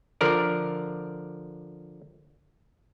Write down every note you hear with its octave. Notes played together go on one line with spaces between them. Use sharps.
D3 F3 A#4 D5